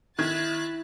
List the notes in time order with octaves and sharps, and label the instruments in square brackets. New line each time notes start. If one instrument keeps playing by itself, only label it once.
[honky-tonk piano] D#3 G#6 [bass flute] E4 [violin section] E5 F#6 A6